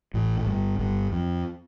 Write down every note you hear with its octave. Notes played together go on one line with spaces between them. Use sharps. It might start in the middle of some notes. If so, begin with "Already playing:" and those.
A1 A2
A2
G1 G2
G1 G2
F2